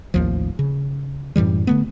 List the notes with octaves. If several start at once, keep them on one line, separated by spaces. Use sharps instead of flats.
A1 D#2 F3
C#3
F#2 A2 E3 G3
D3 A3 B3